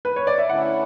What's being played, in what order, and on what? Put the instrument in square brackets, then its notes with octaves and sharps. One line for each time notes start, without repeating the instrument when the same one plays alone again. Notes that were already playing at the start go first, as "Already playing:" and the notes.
[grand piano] B4
C#5
D5
E5
[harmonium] D3 A3 C#4 E4 [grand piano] F#5